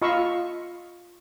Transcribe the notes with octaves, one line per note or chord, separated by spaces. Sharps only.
F4 D#5 F5 B5 C#6 E6